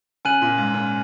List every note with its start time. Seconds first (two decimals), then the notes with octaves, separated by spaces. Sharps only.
0.25 C#3 G#5 F#6 D#7 F#7
0.42 A#2
0.58 G#2
0.74 C#3